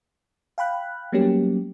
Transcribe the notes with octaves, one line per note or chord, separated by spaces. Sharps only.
F5 G5 B5 F#6
F#3 G3 A#3 B3 C#4 G4